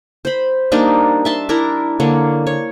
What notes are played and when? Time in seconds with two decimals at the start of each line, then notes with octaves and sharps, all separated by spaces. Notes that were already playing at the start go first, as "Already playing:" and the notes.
0.25 C5 B5
0.72 G3 A#3 D4 D#4
1.25 E5 A5 C6
1.49 D4 E4 A#4 A#5
2.00 D3 A#3 C#5
2.47 C#5